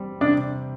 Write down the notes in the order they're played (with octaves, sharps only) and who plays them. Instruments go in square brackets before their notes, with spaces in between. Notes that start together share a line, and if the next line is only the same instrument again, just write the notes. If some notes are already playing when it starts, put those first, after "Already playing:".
Already playing: [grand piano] G3 C4
[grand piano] C3 [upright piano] D4